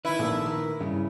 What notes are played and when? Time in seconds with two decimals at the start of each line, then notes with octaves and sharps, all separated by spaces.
0.05 D#3 E4 B4
0.19 A#1 A3 A#3
0.46 A#4
0.80 G2 C#3 E4